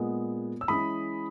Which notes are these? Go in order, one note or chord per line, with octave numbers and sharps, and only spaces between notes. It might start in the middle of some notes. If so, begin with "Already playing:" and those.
Already playing: A#2 G#3 B3
E6
E3 G#3 C#4 B5 D#6